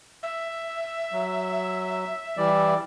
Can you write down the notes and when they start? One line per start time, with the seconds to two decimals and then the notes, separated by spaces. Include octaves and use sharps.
0.23 E5
1.13 F#3
2.37 E3 G3 D5